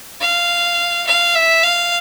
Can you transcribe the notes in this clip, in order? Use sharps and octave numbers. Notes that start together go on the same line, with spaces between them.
F5
F5
E5
F5